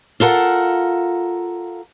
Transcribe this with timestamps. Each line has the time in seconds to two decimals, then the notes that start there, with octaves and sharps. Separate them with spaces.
0.20 F4 A4 A#4 F#5